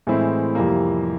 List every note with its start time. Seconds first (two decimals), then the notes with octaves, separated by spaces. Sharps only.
0.07 A2 E3 G#3 C4 E4
0.55 F2 C3 E3 G3 A#3